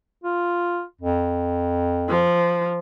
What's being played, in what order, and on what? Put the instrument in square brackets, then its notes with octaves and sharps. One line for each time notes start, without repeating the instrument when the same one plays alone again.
[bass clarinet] F4
F2
[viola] F3